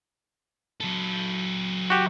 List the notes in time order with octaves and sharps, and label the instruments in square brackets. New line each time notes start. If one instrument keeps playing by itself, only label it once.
[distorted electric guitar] F#3 A4
[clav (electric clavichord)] F#4 G4